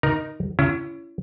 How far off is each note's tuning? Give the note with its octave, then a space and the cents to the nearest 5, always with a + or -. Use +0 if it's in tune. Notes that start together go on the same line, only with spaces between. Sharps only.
D#4 -5 A#4 +10 A#5 +0
C#4 +20 E4 +35